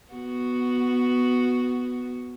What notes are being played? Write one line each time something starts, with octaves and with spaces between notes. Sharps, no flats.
B3 F#4